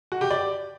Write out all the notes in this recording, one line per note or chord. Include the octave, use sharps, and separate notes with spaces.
F#4
G4
D5